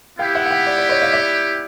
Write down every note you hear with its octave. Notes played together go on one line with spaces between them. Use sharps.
B3 E4 G4 F5 G5
E5 F#5
F#5
F5 G5
D5
D5
C#5 D#5
D#5 F5
D5 E5